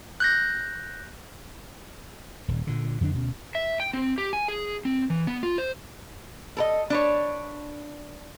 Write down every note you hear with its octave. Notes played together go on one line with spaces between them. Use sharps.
F#6 G6 A#6
D#1
A#2 D3
F2 D3 C4 D4
D2 B2 C#4
E5
G5
C4
G4
G#5
G#4
C4
E3
B3
F4
C5
A4 A#4 D#5
D4 B4 C#5